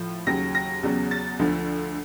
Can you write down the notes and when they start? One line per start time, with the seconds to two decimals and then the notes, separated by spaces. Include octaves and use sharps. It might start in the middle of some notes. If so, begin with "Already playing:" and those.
Already playing: A2 F3
0.26 D#2 C#3 F#3 A#6
0.55 A#6
0.83 E2 C#3 F#3
1.11 A6
1.39 D2 D3 F3